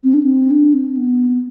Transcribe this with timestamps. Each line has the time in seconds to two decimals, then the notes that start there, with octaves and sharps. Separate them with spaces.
0.04 C4
0.14 D4
0.23 C4
0.51 D4
0.74 C4
0.97 B3